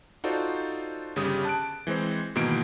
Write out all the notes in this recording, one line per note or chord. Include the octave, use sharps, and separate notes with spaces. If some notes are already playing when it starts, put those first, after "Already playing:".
D#4 F4 F#4 A4 C5 D5
G1 C#3 G3 D#6
A5 F#6 D7
E3 G#3 C4 C5
G#2 B2 D#3 E3 A#3 D7